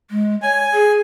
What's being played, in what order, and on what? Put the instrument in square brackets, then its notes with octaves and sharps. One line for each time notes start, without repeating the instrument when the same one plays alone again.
[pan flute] G#3
[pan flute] C#5 [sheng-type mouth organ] G#5
[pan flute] G#4